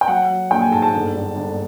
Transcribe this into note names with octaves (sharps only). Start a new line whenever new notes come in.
G5
F#3 F#5
F#3
A#1 G5
G#5
G#2 A5
A5
G1
G2
G1